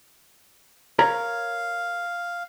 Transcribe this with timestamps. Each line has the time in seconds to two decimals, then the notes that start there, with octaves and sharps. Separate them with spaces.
0.99 A#4 C#5 F5 A#5